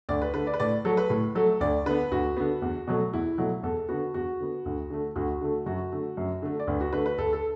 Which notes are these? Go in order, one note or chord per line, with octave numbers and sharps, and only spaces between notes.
D2 D5
B4
D3 A3 B4
D5
B4
A2 D5
F#3 A3 A4
B4
A2
F#3 A3 A4
D2 D5
D3 B3 B4
D2 F#4
D3 B3
E2
B2 F#3 A3
E2 E4
B2 F#3 A3
E2 A4
D3 B3 F#4
E2 F#4
D3 B3
D2
D3 A3
D2 F#4
D3 A3
F#2 F#4
D3 A3
F#2
D3 A3
D5
D2 B4
F#4
D3 A3 B4
B4
D2 A4
A4